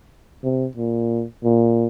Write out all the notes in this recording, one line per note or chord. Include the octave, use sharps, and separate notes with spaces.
C3
A#2
A#2